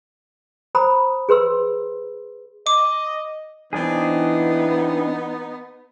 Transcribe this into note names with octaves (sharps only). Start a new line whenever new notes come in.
C5 A#5 B5 D#6
G#4 B4 C6 E6
D#5 D6
E3 B3 C4 D4 D#4 G#4